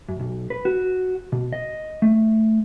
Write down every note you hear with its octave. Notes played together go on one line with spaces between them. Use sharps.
F#2
B1
B4
F#4
B2
D#5
A3